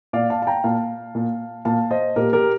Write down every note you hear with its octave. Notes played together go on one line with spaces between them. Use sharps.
A#2 D5 F5
F5 A5
A5
G5 A#5
A#2 F5 A5
A#2
A#2 F5 A5
C5 D#5
A#2 G4 A#4
G4 A#4